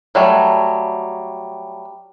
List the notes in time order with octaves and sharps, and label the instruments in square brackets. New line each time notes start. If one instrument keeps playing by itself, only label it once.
[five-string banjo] F#3 G3 A3